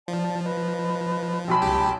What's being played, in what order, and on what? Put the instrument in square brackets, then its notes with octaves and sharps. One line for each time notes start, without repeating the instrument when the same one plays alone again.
[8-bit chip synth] F3 [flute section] D5 A5
[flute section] B4 D#5
[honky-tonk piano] B1 F#3 B5 [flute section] G5 A5 C6
[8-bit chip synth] C#2 G4